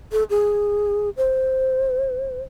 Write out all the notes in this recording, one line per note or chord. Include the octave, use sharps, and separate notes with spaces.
A4
G#4
C5